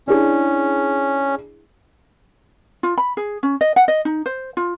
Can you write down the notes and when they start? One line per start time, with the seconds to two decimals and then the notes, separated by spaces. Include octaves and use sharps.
0.08 C#4 D4 E4 G#4
2.83 F4
2.98 B5
3.17 G#4
3.43 C#4
3.61 D#5
3.76 F#5
3.88 D#5
4.05 D#4
4.26 C5
4.57 F4